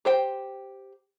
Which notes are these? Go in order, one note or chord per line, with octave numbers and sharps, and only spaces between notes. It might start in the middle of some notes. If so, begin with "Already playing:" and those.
G4 C5 G5